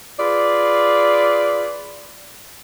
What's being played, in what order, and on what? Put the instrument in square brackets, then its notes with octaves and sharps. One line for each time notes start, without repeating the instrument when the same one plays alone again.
[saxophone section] F4 G#4 B4 D5